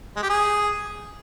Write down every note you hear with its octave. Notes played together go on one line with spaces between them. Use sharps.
G#3
G4
G#4